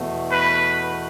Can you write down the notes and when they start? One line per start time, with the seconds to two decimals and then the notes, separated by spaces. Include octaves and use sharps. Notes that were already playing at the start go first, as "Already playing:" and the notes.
Already playing: E2 B2 A3
0.31 B4